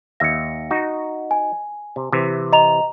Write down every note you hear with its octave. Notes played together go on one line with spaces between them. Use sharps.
D#2 E5 A#6 C#7
D#4 F#4
G#5
C3
C3 E3
D#5 A#5 F7